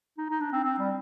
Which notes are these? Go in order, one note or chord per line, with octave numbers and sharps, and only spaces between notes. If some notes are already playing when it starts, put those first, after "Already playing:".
D#4
D#4
D4
C4
C4
G3